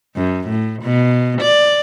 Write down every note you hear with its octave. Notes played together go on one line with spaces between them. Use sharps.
F#2
A2
B2
D5